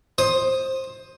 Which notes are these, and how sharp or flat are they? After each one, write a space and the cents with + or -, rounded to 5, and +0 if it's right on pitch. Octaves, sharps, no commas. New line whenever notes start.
C5 +15 D#6 +0